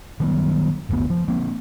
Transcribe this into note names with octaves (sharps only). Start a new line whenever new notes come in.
D#3 F#3 G3 B3
F#1 D2 A3 B3
F3
F3 A#3 C4